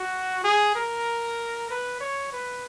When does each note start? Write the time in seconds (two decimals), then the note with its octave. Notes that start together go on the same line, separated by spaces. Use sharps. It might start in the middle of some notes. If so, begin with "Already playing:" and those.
Already playing: F#4
0.44 G#4
0.75 A#4
1.70 B4
2.00 C#5
2.32 B4